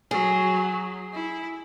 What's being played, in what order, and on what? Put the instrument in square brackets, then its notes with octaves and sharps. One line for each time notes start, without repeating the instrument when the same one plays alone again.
[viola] F#3 [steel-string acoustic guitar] G#4
[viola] E4